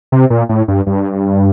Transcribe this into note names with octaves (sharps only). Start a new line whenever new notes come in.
C3
A#2
A2
G2
G2